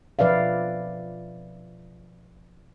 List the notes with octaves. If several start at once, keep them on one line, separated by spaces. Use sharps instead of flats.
B2 F3 B4 D5 E5 F5